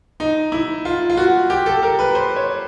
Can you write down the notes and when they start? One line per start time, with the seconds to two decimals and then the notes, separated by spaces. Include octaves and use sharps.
0.20 D#4
0.52 E4
0.85 F4
1.10 F4
1.17 F#4
1.50 G4
1.66 A4
1.83 A#4
1.99 B4
2.15 C5
2.36 C#5